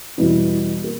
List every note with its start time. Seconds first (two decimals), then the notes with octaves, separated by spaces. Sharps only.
0.18 E2 B2 G3 B3 E4
0.84 A#3